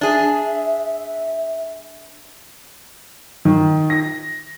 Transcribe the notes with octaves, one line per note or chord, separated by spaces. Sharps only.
D4 G#4 E5
D#3
A#6